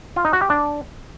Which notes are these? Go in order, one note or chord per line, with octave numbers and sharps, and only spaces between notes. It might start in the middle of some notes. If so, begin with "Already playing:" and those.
F4
D#4
F#4
G4
D4